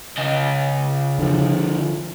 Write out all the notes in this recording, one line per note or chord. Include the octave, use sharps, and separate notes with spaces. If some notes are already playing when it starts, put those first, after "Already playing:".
C#3 D#5
D3 F3